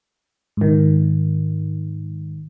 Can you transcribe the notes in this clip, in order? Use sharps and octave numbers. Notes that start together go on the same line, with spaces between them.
G#2 D#3